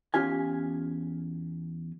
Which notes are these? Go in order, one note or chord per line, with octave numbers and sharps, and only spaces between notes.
E2 C#4 F4 G4 G#5